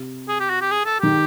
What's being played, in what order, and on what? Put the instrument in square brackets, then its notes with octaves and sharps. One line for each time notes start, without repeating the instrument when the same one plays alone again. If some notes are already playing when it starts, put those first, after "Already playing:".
Already playing: [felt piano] C3
[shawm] G#4
G4
F#4
G4
G#4
A4
[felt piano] D#3 [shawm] G4